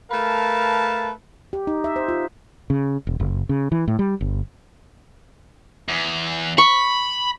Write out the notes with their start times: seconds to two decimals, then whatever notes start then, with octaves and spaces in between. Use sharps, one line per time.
0.11 A3 A#4 B4 F5 A5
1.53 G4
1.67 D#4
1.84 E5
1.96 C5
2.08 F4
2.70 C#3
3.07 E1
3.20 F#1
3.49 C#3
3.72 E3
3.88 A2
3.99 G3
4.21 G1
5.89 E2
6.58 B5 C#6